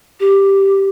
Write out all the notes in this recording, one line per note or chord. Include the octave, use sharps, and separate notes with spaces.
G4